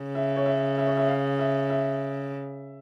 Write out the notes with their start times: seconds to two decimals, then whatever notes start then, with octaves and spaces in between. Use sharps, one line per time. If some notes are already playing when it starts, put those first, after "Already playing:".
Already playing: C#3
0.15 E5
0.37 C#5
0.46 E5
0.78 E5
0.87 C#5
0.97 E5
1.08 F5
1.39 E5
1.70 E5